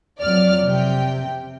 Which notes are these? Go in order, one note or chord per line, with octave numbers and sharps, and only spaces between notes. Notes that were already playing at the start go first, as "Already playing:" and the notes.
F2 F#3 D5 F6
C3 G5